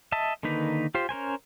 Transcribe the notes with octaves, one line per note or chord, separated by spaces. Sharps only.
D#5 E5 A5
D3 D#3 A#3 D#4 B4
F4 G4 C5
C#4 A#4 C5 G#5